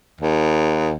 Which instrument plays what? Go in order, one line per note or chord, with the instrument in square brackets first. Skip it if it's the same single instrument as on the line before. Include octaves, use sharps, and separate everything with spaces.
[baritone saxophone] D#2